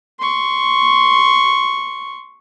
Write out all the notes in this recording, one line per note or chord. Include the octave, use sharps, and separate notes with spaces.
C6 C#6